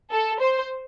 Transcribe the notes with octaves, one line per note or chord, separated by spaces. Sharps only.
A4
C5